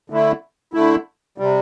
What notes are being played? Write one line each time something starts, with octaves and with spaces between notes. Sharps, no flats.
D3 A3 E4
D3 A3 E4
C3 G3